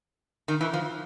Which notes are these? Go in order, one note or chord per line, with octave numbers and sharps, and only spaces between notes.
D#3
E3
F3